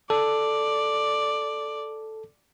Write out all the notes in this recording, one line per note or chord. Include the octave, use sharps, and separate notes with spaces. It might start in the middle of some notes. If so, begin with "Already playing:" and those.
A4 D5